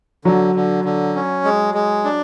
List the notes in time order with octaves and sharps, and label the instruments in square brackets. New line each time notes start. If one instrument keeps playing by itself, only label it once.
[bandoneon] D3 [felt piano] F#3
[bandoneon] D3
D3
C#4
G#3
G#3
D4